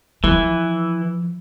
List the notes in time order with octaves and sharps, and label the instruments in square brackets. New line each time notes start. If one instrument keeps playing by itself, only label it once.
[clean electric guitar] E3 [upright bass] F3